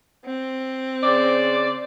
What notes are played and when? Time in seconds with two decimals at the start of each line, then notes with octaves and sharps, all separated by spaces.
0.25 C4
1.03 C#3 C5 D5